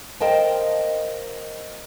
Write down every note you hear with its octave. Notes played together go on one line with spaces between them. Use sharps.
A#4 C5 D#5 F5 G5 A5